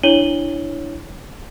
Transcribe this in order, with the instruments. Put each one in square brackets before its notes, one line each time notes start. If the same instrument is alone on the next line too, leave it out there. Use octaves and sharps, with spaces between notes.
[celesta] D4 E4 C#5 D#7 F#7 G7